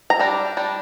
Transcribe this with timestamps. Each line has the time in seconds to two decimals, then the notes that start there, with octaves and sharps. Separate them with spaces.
0.10 A#5
0.19 G3 D4
0.57 G3 D4